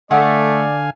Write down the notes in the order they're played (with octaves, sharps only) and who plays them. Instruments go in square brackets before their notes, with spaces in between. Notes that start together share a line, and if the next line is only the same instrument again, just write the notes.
[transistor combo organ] D3 F5 G#5 [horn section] A3 [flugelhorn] D5 [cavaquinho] F#5 D#6